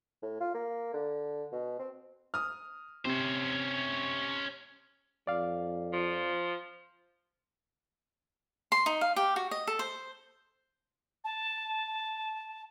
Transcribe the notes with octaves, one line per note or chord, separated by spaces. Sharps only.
A2
F4
A#3
D3
B2
C4
D#6 F6
C3 C#4 C5
F2 D5 F5
F3
C6
D#4
F5
G4
F#4
D#5
A4
C5
A5